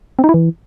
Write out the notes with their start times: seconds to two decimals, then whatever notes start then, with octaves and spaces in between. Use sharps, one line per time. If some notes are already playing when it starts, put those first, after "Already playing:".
0.19 C4
0.24 D#4
0.29 E4
0.34 E3